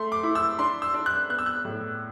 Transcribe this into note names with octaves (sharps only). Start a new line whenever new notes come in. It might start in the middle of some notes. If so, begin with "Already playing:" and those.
Already playing: A3 C6
D6
E4
E6
D4 C6
E6
D4
F#6
B3 F#6
E6
F#6
A2